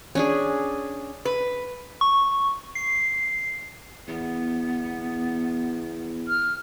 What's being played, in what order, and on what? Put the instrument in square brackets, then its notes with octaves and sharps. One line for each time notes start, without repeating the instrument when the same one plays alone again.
[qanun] C#4 D4 G#4
[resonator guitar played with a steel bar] B4
[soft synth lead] C#6
C7
[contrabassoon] E2 [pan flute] B3
[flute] F6